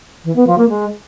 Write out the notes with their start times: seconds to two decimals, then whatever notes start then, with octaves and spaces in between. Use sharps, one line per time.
0.25 E3
0.36 B3
0.47 F3
0.58 A#3
0.69 G#3